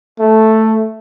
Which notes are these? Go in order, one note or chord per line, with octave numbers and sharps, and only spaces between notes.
A3